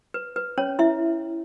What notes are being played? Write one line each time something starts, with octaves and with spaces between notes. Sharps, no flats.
B4
B4
C#4 C#5
E4 E5